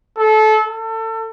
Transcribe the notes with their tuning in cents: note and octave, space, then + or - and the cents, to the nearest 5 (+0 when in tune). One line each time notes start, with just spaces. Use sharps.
A4 -25
A4 +30